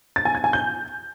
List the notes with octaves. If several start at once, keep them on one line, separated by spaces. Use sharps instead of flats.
A6
G#5
G#6
G#5
G6